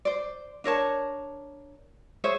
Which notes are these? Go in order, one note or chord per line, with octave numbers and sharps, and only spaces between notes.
C5 D5
D4 A#4 C#5 A5
G#4 C5 C#5 E5